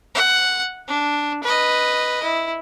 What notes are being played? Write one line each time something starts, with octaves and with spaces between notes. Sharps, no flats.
F#5
D4
B4 D#5
E4